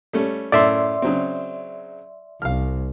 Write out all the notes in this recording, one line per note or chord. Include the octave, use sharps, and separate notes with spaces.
G3 A3 C#4
F#2 A2 D5 E5 C6
C#3 F#3 C4
C2 F5 F6